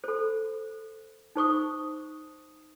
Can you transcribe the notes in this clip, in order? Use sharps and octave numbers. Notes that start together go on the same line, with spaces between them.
A4 C5
D#4 C5 C#6 D#6